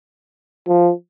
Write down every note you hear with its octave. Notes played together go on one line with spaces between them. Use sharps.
F3